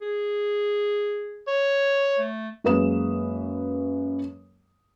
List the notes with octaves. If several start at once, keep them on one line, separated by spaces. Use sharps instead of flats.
G#4
C#5
A3
F#2 G#3 A#3 B4 D#6 E7